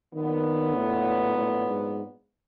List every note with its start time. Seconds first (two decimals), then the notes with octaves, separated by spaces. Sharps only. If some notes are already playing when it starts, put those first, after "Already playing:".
0.13 A#2 D#3 F#3 B3 D4
0.75 A2
1.37 A2
1.69 G#2